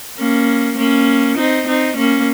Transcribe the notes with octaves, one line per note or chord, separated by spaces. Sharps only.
A#3 C#4
A#3 C#4
C4 D#4
C4 D#4
A#3 C#4